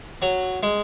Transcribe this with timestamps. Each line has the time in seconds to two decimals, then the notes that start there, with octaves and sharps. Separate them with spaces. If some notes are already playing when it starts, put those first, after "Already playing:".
0.22 F#3
0.63 G#3